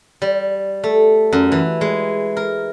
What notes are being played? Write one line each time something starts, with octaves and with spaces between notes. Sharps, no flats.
G3
A3
F#2
E3
G#3
A#4